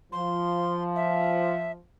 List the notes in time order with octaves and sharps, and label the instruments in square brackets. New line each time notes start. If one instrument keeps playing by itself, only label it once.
[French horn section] F3 [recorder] C6
[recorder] E5